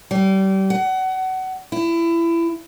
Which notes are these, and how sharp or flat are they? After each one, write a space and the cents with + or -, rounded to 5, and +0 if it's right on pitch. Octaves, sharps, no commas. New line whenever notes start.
G3 -30
F#5 +25
E4 +25